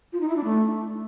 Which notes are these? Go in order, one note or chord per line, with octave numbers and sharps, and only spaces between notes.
F4
D#4
E4
D4
A3